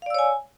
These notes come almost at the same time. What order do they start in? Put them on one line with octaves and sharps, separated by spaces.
F5 D5 E6 C#5 G#5